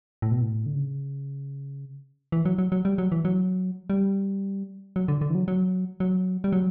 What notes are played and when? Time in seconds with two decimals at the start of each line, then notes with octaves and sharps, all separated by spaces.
0.22 A2
0.31 B2
0.42 A2
0.66 D3
0.75 C#3
2.32 E3
2.45 F#3
2.58 F#3
2.72 F#3
2.85 G3
2.98 F#3
3.12 E3
3.25 F#3
3.90 G3
4.96 F#3
5.08 D3
5.21 D3
5.30 E3
5.35 F#3
5.48 F#3
6.00 F#3
6.44 G3
6.52 F#3